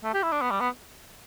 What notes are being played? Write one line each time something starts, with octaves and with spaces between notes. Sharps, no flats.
A3
G4
E4
D4
B3
G3
B3